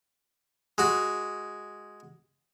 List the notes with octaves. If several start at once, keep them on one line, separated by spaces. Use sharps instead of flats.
G#3 F#4